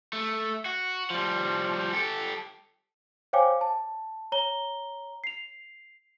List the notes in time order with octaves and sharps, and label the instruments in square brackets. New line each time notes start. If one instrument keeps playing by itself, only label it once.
[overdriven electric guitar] A3
F#4
F3 G3
G4 A4
[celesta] C5 C#5 F5 G5 G#5 D6
A5
C#5 A#5 G7
C7 F7